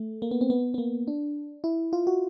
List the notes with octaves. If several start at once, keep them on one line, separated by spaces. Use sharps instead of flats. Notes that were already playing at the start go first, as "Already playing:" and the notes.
Already playing: A3
A#3
B3
C4
B3
B3
A#3
D4
E4
F4
F#4